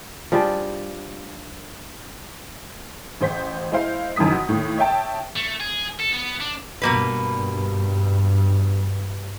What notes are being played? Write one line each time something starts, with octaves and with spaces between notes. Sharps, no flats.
F3 G3 D4 G#4
A1 C5 B6
G#3 E4 C5 F5
F1 F#2 D#3 E3 D#6 B6
F#4
D#2 A2
C#5 E5 G5 A5
A3
G#4
A4
B3
D4
G2 B2 A#3 B4